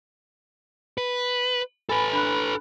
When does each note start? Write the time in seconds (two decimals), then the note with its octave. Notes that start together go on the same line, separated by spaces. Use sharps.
0.98 B4
1.89 A4 B4 G#5 B5 A6
2.13 D4 B5 F#6